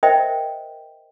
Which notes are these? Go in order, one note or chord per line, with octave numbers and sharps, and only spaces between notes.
A#4 C5 D#5 E5 G5